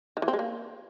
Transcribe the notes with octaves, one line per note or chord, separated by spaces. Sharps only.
D#3
E3
C4
G#3
A#3